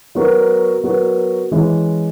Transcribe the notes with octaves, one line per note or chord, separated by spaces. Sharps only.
F#3 B3 F#4 A#4
F#3 B3 F#4 A#4
E3 G#3 C#4